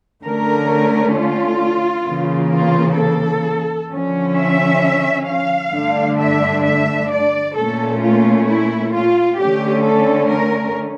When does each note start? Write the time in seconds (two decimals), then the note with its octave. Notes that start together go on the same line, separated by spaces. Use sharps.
0.23 D3 A3 C#4 A#4
1.15 F4
2.06 C#3 E3 A#3
2.52 F4
2.98 A4
3.90 D3 F3 C#4
4.35 E5
5.27 F5
5.72 G2 D3 A3 D4
6.18 E5
6.64 E5
7.10 D5
7.56 A#2 A3 C#4 A4
8.02 F4
8.48 E4
8.93 F4
9.39 D3 A3 C#4 G4
9.84 A4
10.30 A#4